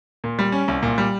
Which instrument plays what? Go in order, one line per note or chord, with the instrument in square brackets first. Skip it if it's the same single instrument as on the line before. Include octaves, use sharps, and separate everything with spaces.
[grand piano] A#2
G3
C#4
C2
A#2
G3